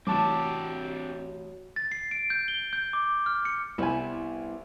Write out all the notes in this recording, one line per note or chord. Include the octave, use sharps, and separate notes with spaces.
A1 C4 D4 F#4 G4 A5 D6
A6
C7
D7
G6
G7
G6
D6
F6
C#7
C2 G3 B3 E4 G#5